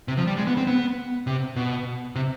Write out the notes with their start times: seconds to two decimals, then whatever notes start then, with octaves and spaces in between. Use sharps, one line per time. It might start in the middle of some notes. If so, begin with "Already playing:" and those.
0.08 C3
0.17 F3
0.27 G3
0.37 G#3
0.47 B3
0.57 C4
0.67 B3
1.27 C3
1.56 B2
2.15 C3